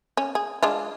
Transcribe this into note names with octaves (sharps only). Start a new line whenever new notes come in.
C#4
G#4
G#3 D4 F4